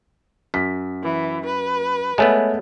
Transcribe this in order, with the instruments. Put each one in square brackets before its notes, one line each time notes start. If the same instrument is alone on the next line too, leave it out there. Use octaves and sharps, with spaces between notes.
[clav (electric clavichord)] F#2 [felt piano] B6
[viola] E3
B4
[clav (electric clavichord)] G#3 A3 B3 [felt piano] C#5 E5 G#5